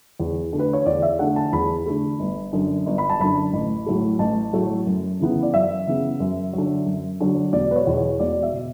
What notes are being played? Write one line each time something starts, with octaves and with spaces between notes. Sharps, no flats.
E2
D3 A3
B4
C#5
E2 D5
E5
D3 A3 F#5
A5
E2 B5
D3 A3
G1
F#2 D3
G1
B5
A5
F#2 D3 B5
A1
A2 F#3 A3
A1 A5
A2 F#3 A3
F#2
C#3 E3 B3
D5
F#2 E5
C#3 E3 B3
F#2
F#3
D3
F#2
D3 F#3
E1 D5
B4
C#5
E2 B2
C#5
E1 D5
E5
B2